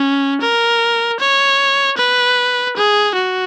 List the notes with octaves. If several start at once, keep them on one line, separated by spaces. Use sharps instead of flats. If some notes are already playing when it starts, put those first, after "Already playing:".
Already playing: C#4
A#4
C#5
B4
G#4
F#4